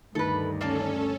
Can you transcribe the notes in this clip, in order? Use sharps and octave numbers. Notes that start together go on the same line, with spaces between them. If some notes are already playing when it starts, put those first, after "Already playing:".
D2 G2 D#3 A3 A4 B4
A#3 C#4 A4 D5 A5